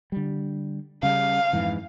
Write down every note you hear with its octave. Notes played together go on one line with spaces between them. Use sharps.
D3 G3
C#3 G3 F5
F2 G#2 E3